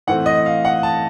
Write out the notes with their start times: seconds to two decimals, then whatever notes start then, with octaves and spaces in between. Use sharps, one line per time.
0.07 A2 E3 A3 C4 F#5
0.26 D#5
0.46 F5
0.65 F#5
0.83 A5